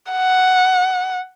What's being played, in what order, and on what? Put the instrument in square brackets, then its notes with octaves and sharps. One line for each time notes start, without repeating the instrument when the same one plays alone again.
[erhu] F#5